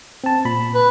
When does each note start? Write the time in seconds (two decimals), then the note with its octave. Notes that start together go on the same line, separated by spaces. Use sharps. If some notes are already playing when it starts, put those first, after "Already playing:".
0.24 C4 A5
0.45 A#2 B5
0.74 B4